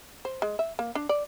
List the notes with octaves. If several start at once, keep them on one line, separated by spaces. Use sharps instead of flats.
C5
G#3
E5
A#3
D4
D5